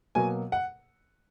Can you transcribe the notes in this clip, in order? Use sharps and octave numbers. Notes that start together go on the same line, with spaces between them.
B2 F#3 A#3 G#5
F#5